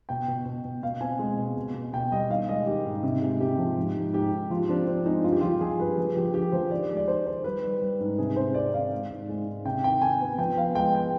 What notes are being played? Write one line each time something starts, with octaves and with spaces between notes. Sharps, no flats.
B2 G5
B2
B2
B2
B2 F5
C4 G#5
G#3
B2
B2
B2
B2 G5
G3 D#5
D#3 F5
G#3 D#5
D#3 G4
G#2
C3
G#3
C3 G4
F3
G#2
G#2
G#2 G4
G#2
F3 F4
C4 D4
C4 D4
G#3 D#4
G2 F4
G4
F3 F4
F3 G#4
G2 B4
F3 G#4
F3 G4
D3 G4
F3 C5
D#3 D5
G#3
D5
D#3 C5
D#3 C5
G3 B4
G3
G3
G#2
C3 G#4
C3 C5
C4 D5
D#3 F5
G#3
G#2
G#3
G#2
C3 G5
D#3 G5
D#3 G#5
B3
F3 G5
B3 F5
G#3 G5
G5